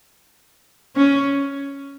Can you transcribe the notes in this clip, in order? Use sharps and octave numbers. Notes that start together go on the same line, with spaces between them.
C#4